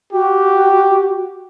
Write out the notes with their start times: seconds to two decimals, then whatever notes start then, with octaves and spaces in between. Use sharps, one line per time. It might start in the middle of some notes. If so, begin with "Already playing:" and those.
0.13 F#4 G4